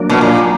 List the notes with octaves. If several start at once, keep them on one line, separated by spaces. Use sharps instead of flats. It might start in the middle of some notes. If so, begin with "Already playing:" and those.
Already playing: F#3 A#3 D4
B2
A#2